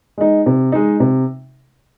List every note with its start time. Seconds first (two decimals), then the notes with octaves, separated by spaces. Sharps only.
0.18 G#3 D#4
0.46 C3
0.72 G#3 D#4
1.00 C3